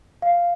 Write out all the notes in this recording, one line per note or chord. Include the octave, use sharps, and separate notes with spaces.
F5